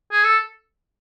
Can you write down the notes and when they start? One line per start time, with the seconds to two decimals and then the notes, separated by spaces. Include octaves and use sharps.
0.11 G#4
0.24 A4